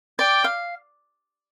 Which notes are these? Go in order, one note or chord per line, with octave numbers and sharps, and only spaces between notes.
D5 G5
F5